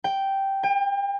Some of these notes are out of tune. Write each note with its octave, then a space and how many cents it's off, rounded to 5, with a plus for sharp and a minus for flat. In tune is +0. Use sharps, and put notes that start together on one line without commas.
G5 -5
G5 +35